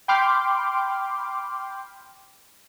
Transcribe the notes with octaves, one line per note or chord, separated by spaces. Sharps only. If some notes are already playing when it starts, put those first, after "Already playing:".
G5 B5 C6 D6 F6 G6